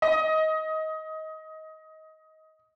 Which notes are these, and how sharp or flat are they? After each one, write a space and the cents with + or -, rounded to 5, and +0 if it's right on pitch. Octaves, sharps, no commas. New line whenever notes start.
D#5 +20